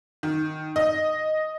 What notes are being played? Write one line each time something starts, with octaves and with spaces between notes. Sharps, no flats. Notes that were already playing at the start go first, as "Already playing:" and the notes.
D#3
D#5